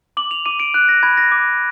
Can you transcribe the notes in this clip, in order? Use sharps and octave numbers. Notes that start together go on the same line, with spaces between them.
D6 F#7
F7
D6 D#7
D7
F#6
A#6
B5 G#6
A#6
D6